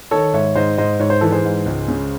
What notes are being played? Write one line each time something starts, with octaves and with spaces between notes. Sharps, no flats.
D#3 A4 C#5
G#2 C#5 E5
G#2 C5 D#5
G#2 C5 D#5
G#2 C#5
C5
E3 A4
G#4 C5
G#2
C#2
C#3